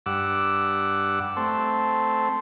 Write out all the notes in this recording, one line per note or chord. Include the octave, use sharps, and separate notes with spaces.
G2 F#5 D6 E6
A3 C4